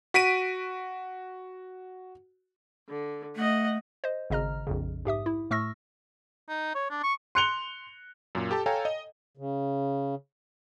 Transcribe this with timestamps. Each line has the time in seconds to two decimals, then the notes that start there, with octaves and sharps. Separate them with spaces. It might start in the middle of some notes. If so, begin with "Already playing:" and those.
0.14 F#4 B6 D7 D#7
2.90 D3
3.36 A3 D#5 F#5
4.04 C5 D#5
4.30 G#1 C#3 D#5 A#5 F6
4.67 A#1 F2 C#3
5.05 G#2 G4 E5 D#6
5.26 E4
5.51 A2 A3 C#6 E6 F6 A#6
6.49 D#4
6.75 C#5
6.91 D4
7.03 C#6
7.35 C6 F#6 C#7 F7 G7
8.35 F#2 A#2
8.51 G4 A4 A5
8.66 A4 C#5 F5 G5 G#5 A#5
8.85 D#5
9.37 C#3